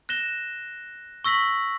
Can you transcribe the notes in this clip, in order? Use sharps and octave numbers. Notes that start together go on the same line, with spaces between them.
F#6 A#6 E7 G7
C#6 E6 A#6 B6 F#7